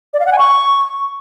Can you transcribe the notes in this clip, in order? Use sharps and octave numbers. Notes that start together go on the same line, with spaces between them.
D5
F5
F#5
G#5
C#6